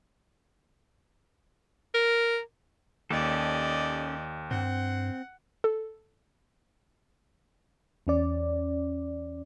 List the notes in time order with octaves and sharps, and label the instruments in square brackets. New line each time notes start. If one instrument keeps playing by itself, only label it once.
[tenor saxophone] A#4
[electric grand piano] D#2 [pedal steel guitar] C#4 G4 A4 [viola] D5 D#5
[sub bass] G2 [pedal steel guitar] C4 [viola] F#5
[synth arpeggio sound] A4
[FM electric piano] E2 C#4 D5